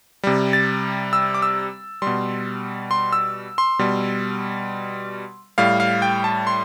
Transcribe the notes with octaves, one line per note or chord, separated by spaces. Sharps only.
C3 G3
A6
E6
D6
E6
B2 G3 C6
C6
E6
C6
B2 G3
A2 G3 F5
F5
G5
A5
C6